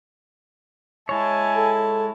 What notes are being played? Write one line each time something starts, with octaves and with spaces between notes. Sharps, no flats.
G#3 E4 C#5 G#5 A5
A4